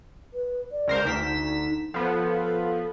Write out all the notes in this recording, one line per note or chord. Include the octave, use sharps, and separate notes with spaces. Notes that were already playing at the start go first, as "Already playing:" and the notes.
B4
D5
C#2 A#4 C5
D2 D#4 B6 E7
F3 B3 A4